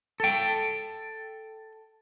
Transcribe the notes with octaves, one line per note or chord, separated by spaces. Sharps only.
A4 G5